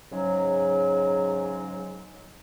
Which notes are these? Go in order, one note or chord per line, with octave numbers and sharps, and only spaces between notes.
G#2 C#3 F#3